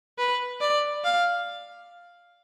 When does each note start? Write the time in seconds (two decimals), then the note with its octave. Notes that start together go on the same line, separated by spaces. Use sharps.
0.18 B4
0.60 D5
1.04 F5